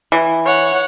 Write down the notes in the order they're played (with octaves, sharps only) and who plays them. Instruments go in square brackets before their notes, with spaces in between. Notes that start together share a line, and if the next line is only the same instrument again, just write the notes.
[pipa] E3
[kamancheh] C#5 F#5